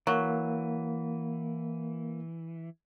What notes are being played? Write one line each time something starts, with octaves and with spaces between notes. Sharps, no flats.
E3 F#3 A#3